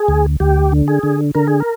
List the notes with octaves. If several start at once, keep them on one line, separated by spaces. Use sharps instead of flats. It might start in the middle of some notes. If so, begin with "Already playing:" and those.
Already playing: G#4
D2
D2 G4
D3
G#4
D3
D3 A#4
G#4
A#4